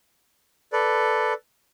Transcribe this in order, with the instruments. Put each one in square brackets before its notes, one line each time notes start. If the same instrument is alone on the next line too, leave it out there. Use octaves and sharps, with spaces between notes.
[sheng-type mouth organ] A4 B4 D5